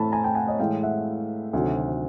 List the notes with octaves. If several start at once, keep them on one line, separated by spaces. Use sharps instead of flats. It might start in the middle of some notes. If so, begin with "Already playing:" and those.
Already playing: A2 E3 A3 A5 B5
G#5 A#5
G5 A5
F#5 G#5
C#5 D#5
A2 E3 G#3 F5 G5
E5 F#5
D2 C3 D#3 F#3 A3